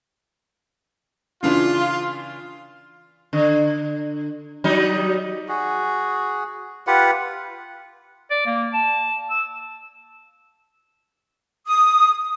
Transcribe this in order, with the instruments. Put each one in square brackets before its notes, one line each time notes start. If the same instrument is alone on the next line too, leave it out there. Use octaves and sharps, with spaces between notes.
[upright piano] C#3 E3 D4 [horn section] F4
[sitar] D3
F#3 G3 D#4
[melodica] F#4 G#4
F4 G4 B4 F#5
[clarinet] D5
A#3
A5
E6
[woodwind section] D#6